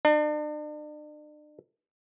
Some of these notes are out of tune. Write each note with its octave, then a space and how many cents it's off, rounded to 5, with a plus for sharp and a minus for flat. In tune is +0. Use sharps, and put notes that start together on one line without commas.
D4 +40